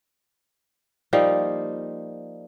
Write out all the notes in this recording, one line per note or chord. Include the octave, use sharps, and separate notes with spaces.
F3 G3 A#3 D#4